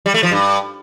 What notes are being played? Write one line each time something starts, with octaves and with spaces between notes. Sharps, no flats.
G3
A3
F3
G2